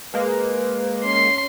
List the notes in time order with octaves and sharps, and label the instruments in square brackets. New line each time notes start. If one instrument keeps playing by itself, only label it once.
[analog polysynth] G#3 A#3 [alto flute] B4
[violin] C#4 C7 [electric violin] C6